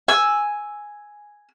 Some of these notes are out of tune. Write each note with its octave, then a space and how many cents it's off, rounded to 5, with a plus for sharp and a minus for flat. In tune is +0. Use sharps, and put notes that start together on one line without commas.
G#5 +0 E6 +0